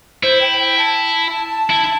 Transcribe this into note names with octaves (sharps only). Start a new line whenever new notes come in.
E4 C5
G5
G5
A5
E4